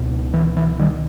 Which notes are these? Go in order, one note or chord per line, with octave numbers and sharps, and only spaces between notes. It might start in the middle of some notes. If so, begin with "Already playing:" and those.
Already playing: C#2 B2
E3
E3
D#3 G3